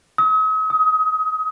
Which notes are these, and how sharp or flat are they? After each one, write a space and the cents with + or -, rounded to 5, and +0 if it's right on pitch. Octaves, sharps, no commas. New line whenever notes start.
D#6 +45
D#6 +25